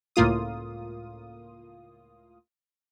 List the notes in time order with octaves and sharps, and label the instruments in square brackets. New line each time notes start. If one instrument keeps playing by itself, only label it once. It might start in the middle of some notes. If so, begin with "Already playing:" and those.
[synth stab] C#2 A2 A#3 F4 D#6